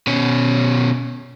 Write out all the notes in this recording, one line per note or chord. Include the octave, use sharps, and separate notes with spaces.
B2 C#4